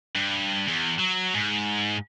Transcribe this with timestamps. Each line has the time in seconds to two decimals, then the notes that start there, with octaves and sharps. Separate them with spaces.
0.15 G2
0.67 E2
0.98 F#3
1.34 G#2